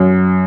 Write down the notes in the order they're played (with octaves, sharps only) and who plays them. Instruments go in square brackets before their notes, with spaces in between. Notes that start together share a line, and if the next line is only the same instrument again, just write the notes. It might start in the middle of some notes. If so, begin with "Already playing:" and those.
Already playing: [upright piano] F#2